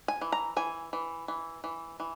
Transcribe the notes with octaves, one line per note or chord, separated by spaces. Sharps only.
G#5
E3
A#5
E3 G#5
E3
E3
E3
E3